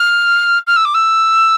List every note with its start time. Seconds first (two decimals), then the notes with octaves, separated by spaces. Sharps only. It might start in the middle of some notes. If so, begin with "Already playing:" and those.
Already playing: F6
0.67 F6
0.76 E6
0.85 D6
0.94 E6